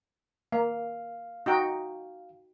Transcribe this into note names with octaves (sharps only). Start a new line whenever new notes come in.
A#3 F5
D#4 F#4 G5